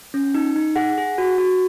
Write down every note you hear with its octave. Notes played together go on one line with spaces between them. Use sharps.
C#4
D#4
D#4
G#4 F#5
G#4
F#4
F#4